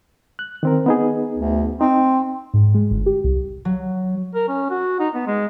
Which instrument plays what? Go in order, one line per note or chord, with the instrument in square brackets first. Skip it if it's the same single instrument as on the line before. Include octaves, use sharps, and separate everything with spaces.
[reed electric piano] F#6
D#3 C4 A#4
B3 D#4 G#4
[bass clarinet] D2
[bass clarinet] C4 [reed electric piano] D#4
[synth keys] G#2
G#3
G1
G4
C2
[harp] F#3
[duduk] A#4
C#4
F#4
D#4
B3
G#3